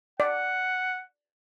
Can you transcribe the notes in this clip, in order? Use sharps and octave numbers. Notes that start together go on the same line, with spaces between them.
D5 F#5